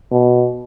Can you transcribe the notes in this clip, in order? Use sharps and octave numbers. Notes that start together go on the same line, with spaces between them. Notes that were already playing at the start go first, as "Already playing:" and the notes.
B2